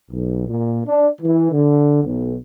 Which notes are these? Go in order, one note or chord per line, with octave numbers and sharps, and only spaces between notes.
B1
A#2
D4
E3
D3
B1